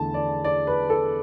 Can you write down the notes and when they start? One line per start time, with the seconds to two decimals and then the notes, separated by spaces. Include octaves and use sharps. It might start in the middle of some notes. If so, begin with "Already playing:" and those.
Already playing: E2 D3 A3 E4 A5
0.14 D5
0.44 D5
0.67 B4
0.90 A4